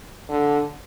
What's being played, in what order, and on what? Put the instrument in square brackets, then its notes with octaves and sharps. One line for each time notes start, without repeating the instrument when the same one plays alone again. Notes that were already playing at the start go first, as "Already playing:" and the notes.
[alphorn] D3